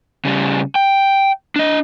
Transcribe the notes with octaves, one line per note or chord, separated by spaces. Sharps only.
C#3 G3
G5
D4 D#5